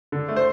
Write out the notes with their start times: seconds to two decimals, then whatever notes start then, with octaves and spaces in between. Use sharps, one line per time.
0.12 D3
0.28 A3
0.36 C5